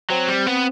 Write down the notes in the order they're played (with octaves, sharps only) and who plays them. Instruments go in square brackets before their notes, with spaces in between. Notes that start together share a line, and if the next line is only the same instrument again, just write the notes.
[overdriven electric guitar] F#3 [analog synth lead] C4
[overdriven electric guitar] G3
B3